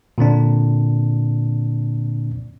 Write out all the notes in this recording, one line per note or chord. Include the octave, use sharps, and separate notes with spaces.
A#2 D3 C4 D4